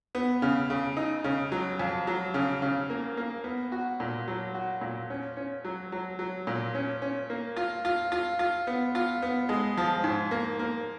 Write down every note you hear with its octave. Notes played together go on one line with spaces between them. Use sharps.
B3
C#3
C#3
D#4
C#3
F#3
F2
F#3
C#3
C#3
A#3
A#3
B3
F#4
A#2
F#3
F#4
A#2
C#4
C#4
F#3
F#3
F#3
A#2
C#4
C#4
A#3
F4
F4
F4
F4
B3
F4
B3
G#3
F3
G#2
A#3
A#3